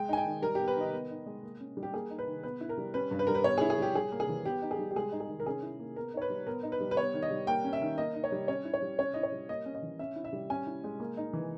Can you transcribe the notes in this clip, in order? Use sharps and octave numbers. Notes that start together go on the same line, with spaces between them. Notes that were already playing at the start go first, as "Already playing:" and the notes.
Already playing: G#3 G5
D#4 G#5
G5
D#3
G3 A#4
B3 G4
B4
D#3 D#5
B3
D#4
G#3
A#3
C#4
G3
G4
A#3 G#4
D#4
B4
D#3
B3 B4
E4
A#4
G3
C#4 B4
G2
B4
G3 A#4
B4
B3 C#5
G#4
E4
G#4
G3 G4
G3 G#4
A#3
G#4
E3
B3 G4
D#4
G#4
G3
G4
G#3 G#4
D#4
G#4
D#3
A#4
C#4 G#4
E4
A#3
B3 A#4
D#4 C#5
B4
G3
B3 A#4
D#4
B4
G3
B4
B3 C#5
D#3
D#5
G3
A#3 G5
C#4
E5
D#3
A#3 D#5
D#4
C#5
G3
C#4 C#5
E4
C#5
G3
C#4 C#5
E4 D#5
C#5
G3
A#3 D#5
C#4
D#5
E3
C#4 E5
E4
E5
G3
C#4 G#5
E4
G#3
A#3
D#4
E3